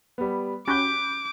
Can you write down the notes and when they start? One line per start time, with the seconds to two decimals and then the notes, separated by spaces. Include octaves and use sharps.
0.18 G3 B3
0.68 C#4 F#4 G4 B5 D6 F#6 G6